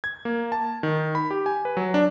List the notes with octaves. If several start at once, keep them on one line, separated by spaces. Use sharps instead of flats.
G#6
A#3
A5
D#3
B5
G4
G#5
B4
F#3
D4